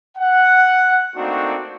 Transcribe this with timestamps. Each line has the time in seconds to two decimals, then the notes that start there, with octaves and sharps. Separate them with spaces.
0.18 F#5
1.16 A3 A#3 C4 D4 D#4 F#4